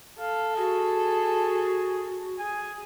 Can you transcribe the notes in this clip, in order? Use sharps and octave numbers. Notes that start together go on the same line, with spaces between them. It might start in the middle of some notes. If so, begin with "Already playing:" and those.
A4 F5
F#4 G#4
G#4 G#5